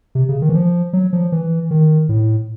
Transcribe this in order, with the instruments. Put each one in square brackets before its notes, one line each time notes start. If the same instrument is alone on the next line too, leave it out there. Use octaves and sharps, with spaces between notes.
[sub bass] C3
C#3
D#3
E3
F3
F#3
F3
E3
D#3
A2